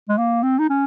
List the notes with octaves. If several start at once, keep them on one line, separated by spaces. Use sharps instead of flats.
G#3
A#3
C4
D#4
C#4